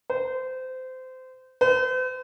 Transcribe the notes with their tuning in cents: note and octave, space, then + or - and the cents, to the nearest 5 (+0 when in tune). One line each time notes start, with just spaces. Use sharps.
C5 -25
C5 -45